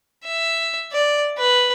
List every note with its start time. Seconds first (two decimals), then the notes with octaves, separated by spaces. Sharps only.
0.24 E5
0.92 D5
1.38 B4